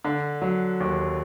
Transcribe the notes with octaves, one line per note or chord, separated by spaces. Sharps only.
D3
F#3
D#2